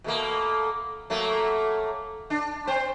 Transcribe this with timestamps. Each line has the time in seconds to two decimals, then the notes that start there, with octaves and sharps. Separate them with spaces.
0.04 B2 A3 A#3
1.10 F#3 A3 A#3
2.30 D4
2.67 C4 C5